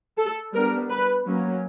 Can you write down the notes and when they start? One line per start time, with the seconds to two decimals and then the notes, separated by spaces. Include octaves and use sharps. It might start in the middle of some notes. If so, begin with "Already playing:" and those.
0.18 A4
0.54 G3 B3 D4 A#4
0.90 B4
1.26 F#3 A#3 C#4